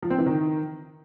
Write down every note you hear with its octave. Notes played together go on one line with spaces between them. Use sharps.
F3
C4
E3
D#3